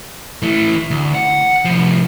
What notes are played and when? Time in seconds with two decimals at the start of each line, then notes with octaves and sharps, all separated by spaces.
0.43 E3 A3
0.91 D2
1.15 F#5
1.65 C2 F3